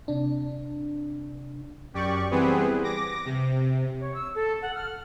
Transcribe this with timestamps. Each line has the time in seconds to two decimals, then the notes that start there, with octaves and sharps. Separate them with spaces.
0.08 C3 D4
1.94 F#2 G4 D5 C#6
2.31 E3 G3 B3 C4 G#4 B4
2.83 D6 A#6
3.25 C3
4.00 C#5
4.14 E6
4.34 A4
4.62 F#5
4.75 F6